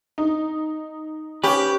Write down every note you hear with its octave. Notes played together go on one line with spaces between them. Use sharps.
D#4
C#4 G4 B4 G5